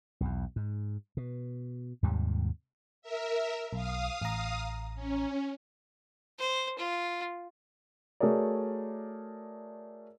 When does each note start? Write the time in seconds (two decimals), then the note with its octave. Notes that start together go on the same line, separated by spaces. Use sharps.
0.21 B1 E2
0.56 G#2
1.17 B2
2.03 D#2 G#2 C3 G3
3.02 A#4 E5
3.73 B1 F5 D#6
4.21 A1 A#5
4.95 C#4
6.39 C5
6.78 F4
8.20 A3 F#4 G#4 A#4 C#5 D5